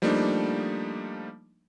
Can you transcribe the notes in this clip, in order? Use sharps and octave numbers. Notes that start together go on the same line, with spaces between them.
F3 G3 A3 A#3 D4 D#4